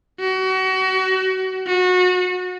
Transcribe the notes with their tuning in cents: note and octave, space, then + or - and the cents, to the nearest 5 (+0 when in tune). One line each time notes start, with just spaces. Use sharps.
F#4 +30
F#4 -25